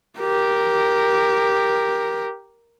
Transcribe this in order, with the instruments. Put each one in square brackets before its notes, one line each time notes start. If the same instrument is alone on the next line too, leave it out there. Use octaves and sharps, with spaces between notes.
[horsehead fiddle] G4 A#4